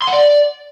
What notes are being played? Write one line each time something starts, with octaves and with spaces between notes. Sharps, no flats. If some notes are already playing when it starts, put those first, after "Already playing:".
C6
F#5
D5